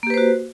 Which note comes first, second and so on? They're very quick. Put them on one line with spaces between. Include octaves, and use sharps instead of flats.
A#3 G4 B4 C5 F#4